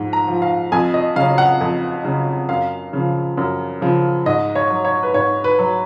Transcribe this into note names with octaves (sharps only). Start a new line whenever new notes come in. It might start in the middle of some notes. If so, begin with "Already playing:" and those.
Already playing: G#2 F3
A#5
F3
F5
F2 G#5
D#5
C#3 F#3 F5
F#5
F2
C#3 F#3
F#2 F5
C#3 F3
F#2
C#3 F3
G#2 D#5
C#5
F#3
C#5
B4
G#2 C#5
B4
F#3